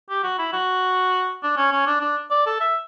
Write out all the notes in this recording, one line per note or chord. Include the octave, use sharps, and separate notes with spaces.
G4
F#4
E4
F#4
D4
C#4
C#4
D4
D4
D5
A4
E5